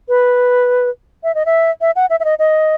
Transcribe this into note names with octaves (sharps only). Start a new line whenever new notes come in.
B4
E5
D#5
E5
E5
F#5
E5
E5
D#5
D#5